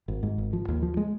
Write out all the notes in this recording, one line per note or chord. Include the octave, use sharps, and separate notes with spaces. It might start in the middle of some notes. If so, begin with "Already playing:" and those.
G#1
G#2
G#1
F3
D#2
F3
G#3